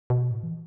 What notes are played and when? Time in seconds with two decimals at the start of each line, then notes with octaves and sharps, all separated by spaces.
0.10 B2
0.31 A2
0.43 E3